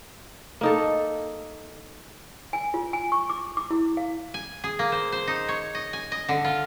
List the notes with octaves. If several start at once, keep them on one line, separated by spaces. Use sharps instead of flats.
A#3 D#4 A4
G#5
F4
G#5
C#6
D6
D6
E4
F5
G#5
G#4
A#3
C5
C5
D#4
C#5
D#5
G#5
D#5
D3
F4